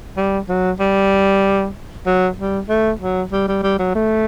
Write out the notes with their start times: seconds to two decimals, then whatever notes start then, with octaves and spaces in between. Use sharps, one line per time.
0.17 G3
0.49 F#3
0.79 G3
2.06 F#3
2.38 G3
2.69 A3
3.00 F#3
3.32 G3
3.48 G3
3.63 G3
3.79 F#3
3.95 A3